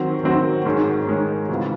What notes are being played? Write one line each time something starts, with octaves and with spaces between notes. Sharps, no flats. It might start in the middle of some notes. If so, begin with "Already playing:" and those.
Already playing: D#3 F#3 C4 F#4
D#3 F#3 C4 F#4
G#2 D#3 G#3 C#4
G#2 D#3 G#3 C#4
C#2 C#3 E3 C4 F#4